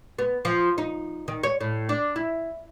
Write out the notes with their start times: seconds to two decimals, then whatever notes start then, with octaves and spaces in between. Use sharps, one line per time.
0.18 B3
0.45 F3
0.78 D#4
1.28 D#3
1.43 C#5
1.61 A2
1.89 D4
2.16 E4